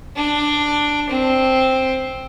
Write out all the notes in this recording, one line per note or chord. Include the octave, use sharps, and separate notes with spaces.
D4
C4